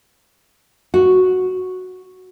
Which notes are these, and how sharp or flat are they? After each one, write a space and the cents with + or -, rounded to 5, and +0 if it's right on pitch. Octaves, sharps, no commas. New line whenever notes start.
F#4 -5